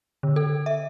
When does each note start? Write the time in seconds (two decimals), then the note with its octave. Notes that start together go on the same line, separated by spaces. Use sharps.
0.23 D3
0.36 A4
0.66 E5